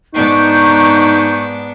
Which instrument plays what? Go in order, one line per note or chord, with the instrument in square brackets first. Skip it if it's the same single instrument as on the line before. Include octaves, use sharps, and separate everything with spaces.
[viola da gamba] G#2 B3 D4 [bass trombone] D#4 [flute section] C#6 G6